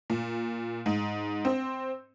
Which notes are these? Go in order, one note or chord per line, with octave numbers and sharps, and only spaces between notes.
A#2
G#2
C4